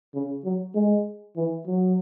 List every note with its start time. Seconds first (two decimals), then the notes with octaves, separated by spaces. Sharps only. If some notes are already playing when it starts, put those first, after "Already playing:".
0.15 C#3
0.45 F#3
0.75 G#3
1.36 E3
1.67 F#3